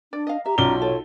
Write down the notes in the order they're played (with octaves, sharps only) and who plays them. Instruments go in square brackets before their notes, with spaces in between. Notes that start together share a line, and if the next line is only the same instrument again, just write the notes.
[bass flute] D4 [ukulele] D5
[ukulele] D#5 F5
[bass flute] G4 [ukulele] E5 [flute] A#5
[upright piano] B1 G7 [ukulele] C#4 D5 [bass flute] F4
[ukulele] A4 [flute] C#5